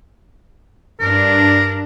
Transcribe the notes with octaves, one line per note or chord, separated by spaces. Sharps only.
G2 D4 A#4